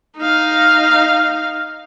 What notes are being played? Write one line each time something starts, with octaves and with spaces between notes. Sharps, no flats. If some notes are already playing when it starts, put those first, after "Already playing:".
D#4 F5